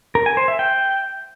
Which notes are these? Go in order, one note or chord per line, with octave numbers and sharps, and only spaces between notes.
A#4
G#5
C5
E5
G5